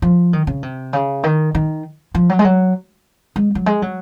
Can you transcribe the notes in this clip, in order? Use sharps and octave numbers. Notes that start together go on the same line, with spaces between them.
F3
D#3
C#3
C3
C#3
D#3
D#3
F3
F#3
G#3
F#3
G#3
F#3
G#3
F#3